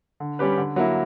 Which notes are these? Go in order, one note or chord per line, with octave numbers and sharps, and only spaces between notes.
D3
G3 C#4 G4 B4
D3
F#3 A#3 E4